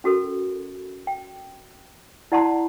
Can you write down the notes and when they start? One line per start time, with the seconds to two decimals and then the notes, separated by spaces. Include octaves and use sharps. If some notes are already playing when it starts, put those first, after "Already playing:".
0.04 C#4 F#4 A4 A#4
1.07 G5
2.32 E4 D5 F#5 A5 A#5 C6